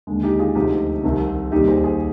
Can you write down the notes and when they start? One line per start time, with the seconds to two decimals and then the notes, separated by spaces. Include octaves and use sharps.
0.07 D#2 D3 G#3
0.23 D#4 G4
0.39 F4 G#4
0.55 D2 C3 F3 D#4 G4
1.03 C2 C3 D#3
1.52 D#2 D#3 G3 D#4 G4
1.68 G#4 C5
1.84 G#4 C5